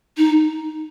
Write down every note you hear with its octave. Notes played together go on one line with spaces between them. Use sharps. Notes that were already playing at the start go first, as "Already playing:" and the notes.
D#4